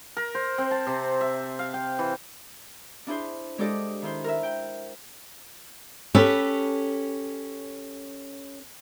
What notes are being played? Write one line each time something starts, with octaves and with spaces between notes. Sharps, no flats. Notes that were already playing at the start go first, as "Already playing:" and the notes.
A#4
C5
C4
A5
C3
E5
F5
G5
E3
D4 E4 G#4 C5
G#3 D4 G4 A4 D5 D#5
D#3 E4 C5
A#4 E5
G5
C#4 G4 A4 B4 C#5